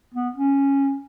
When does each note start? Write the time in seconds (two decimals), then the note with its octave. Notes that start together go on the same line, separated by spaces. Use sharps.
0.14 B3
0.36 C#4